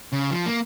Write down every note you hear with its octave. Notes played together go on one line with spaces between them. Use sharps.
C#3
F3
A#3